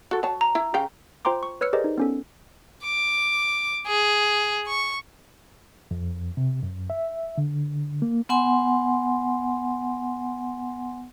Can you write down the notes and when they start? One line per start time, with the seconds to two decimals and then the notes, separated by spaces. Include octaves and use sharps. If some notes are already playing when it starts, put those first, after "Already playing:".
0.11 F#4 A4
0.23 F#3 C#5 A5
0.41 A#5
0.55 E4
0.74 C#3 F5 G5
1.25 F4 C5 G5 A#5 C6 D6
1.43 C#6
1.61 B4 C#5 E6 F6 C#7
1.73 G4 G#4 A#4 C5 D5 D#5
1.84 D#4
1.98 B3 C#4 A4
2.84 D6
3.87 G#4
4.67 C#6
5.91 F2
6.37 C3
6.63 F#2
6.90 E5
7.38 D3
8.02 A#3
8.29 B3 F#5 G#5 C6